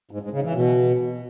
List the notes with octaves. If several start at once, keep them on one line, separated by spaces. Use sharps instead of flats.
G#2
G#2
C#3
E3
B2